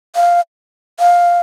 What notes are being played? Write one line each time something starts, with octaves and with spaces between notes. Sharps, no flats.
F5
F5